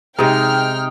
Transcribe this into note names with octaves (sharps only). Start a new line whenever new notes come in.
C3 G#3 D#4 G5 F6